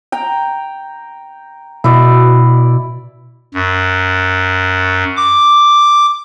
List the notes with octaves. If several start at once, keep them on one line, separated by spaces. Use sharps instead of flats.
G5 A#5
B2 E4 D5
F#2
D6